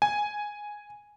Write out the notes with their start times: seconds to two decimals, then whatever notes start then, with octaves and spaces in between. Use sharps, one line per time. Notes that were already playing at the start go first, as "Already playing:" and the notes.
0.02 G#5